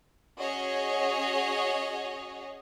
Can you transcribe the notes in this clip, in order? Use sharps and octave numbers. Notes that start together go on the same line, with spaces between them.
C#4 F#4 G#4 C#5 D#5